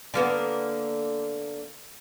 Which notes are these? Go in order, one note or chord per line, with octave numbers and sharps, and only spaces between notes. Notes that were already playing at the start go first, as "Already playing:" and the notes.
D3 A#3 B3